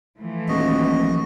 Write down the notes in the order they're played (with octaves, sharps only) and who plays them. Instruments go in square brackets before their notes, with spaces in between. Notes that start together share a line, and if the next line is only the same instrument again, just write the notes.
[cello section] E3 F3 A3
[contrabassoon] D#1 [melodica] F#4 D#5